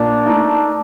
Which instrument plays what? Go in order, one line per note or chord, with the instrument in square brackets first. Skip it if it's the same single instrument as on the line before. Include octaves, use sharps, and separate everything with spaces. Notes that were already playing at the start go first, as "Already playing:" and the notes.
Already playing: [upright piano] A#2 [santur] D4
[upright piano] A3 D#4